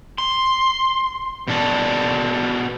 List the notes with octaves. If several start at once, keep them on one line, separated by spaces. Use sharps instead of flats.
C6
B2 D4